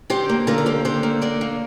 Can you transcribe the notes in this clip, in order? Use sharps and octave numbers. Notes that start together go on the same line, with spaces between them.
D3 G4 C5
A#3
D3 F4 A#4
A#4
A#3 G4 C5
D3 G4 C5
A#3
D3 A#4 D5
A#3